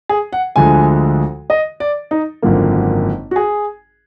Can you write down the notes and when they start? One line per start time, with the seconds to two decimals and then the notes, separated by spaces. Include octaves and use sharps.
0.09 G#4
0.33 F#5
0.56 D2 D3 F3 G#3 G#5
1.50 D#5
1.80 D5
2.11 D#4
2.42 G#1 F#2 D3 F3 A#3
3.31 F#4
3.36 G#4